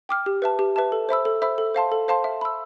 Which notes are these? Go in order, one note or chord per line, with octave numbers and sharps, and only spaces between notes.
G5 D6 F6
G4
B4 E5 A5
G4
B4 E5 A5
A4
C5 E5 B5 E6
A4
C5 E5 B5 E6
A4
C5 F5 A5 C6
A4
C5 F5 A5 C6
E5
B5 E6